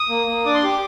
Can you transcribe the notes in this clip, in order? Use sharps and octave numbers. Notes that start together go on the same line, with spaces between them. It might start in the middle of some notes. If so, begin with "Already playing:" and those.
Already playing: D#6
A#3
A#3
D4 D6
C6
G4 D6